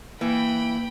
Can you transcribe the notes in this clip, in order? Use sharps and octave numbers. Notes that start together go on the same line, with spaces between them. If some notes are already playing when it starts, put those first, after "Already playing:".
E3 A#3 G5 B5